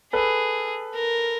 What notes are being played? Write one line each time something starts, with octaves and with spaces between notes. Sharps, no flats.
G#4 A4 B4
A#4